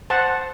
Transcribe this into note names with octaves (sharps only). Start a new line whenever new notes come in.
C5 F#5 A5